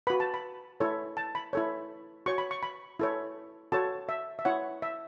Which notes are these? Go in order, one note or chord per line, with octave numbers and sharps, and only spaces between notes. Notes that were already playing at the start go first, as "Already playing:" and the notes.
F#4 B4 B5
A5
B5
E4 A4 C#5
A5
B5
E4 A4 C#5
F#4 C#5 C#6
B5
C#6
B5
E4 A4 C#5
F#4 A4 C#5 A5
E5
E5
E4 C#5 F#5
E5